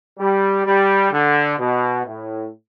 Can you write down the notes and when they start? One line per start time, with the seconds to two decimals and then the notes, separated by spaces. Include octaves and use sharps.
0.19 G3
0.66 G3
1.11 D3
1.58 B2
2.05 A2